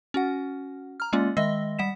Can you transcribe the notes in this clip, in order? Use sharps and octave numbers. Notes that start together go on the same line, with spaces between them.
C#4 F#4 F#5
A#5 F6
G#3 A#3 C#4 F4 D5
D#3 G#3 D#5 E5 E6 A#6
G3 F#5 B6 E7